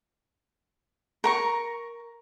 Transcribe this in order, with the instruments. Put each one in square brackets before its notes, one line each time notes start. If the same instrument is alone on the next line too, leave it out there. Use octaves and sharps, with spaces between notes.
[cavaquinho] A#4 A#5 C#6